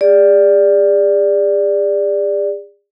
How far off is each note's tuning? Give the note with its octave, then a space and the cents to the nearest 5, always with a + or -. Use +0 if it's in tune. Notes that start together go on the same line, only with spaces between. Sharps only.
G#4 -40 D5 +0